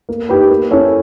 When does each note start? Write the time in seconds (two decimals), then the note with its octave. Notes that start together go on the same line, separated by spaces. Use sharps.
0.09 A#3
0.29 D#4 G4 B4
0.50 A#3
0.71 C#4 E4 A4 C#5